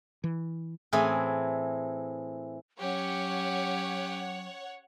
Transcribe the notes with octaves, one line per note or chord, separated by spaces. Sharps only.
E3
A2 E3 C4 G#4 G#5
F#3 C#4 G4 C#5 F#5